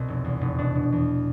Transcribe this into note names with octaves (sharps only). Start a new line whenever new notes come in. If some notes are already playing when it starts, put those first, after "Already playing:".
Already playing: C2 B2 C4
F1
E2
F1
B2 D4
B2
E2